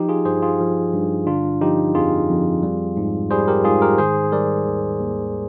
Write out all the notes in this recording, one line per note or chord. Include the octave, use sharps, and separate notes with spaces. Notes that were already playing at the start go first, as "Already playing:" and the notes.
Already playing: F3 D#4 G4
F4 G#4
G2 G#4 C5
F4 G#4
F3
G2
D3 D4 F4
F3 D#4 G4
F2 F4 G#4
F2
G3
G#2
G3 G#4 C5
G4 A#4
G#2 F4 G#4
G4 A#4
D#3 G#4 C5
G3 A#4 D5
D#2
D#2